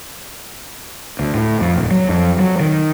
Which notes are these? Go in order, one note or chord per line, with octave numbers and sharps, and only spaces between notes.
D2
A2
F2
D#1
F#3
F2
F#3
D#3